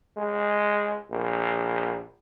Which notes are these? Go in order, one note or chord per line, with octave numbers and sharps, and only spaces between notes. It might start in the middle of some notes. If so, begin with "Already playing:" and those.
G#3
A#1